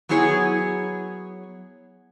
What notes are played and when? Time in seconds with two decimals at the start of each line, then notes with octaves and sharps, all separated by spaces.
0.09 F#3 B3 E4 G#4 C#5